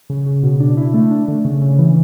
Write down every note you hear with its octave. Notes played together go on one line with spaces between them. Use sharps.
C#3
C#3
B2
D4
E4
A3
D4
D3
C#3
C#3
E3